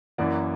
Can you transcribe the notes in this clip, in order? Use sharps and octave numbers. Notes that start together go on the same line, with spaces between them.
F#2 E3 A#3 D5 F#5